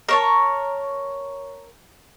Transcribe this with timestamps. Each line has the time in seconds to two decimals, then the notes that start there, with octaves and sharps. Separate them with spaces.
0.09 A#4 C#5 A5